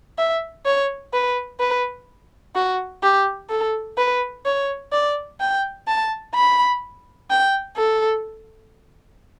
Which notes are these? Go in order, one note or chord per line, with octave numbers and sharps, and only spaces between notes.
E5
C#5
B4
B4
F#4
G4
A4
B4
C#5
D5
G5
A5
B5
G5
A4